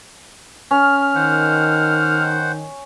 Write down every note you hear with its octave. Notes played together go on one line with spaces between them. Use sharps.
C#4 F6
D#3 C5 F#5